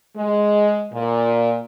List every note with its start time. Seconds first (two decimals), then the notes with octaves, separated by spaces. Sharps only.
0.16 G#3
0.93 A#2